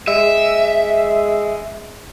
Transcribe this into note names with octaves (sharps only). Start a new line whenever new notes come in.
G#3 E5